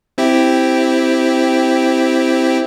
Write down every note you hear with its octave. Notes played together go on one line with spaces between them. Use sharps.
C4 E4 G4